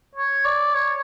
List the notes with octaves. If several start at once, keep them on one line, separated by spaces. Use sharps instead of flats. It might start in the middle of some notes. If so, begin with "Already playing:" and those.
C#5
D5
C#5